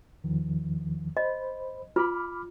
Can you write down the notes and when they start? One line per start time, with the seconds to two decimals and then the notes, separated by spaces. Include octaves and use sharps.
0.24 E2 D#3 F3
1.17 C5 D#5 B5
1.96 F4 B5 D6 F6